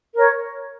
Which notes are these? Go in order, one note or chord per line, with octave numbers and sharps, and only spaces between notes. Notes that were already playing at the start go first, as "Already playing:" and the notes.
A#4 C#5